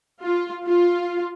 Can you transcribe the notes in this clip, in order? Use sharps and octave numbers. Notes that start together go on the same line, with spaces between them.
F4
F4